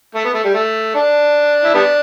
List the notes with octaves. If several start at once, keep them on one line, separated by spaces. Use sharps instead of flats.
A3
B3
A3
G3
A3
D4
E4
G3 B3 D4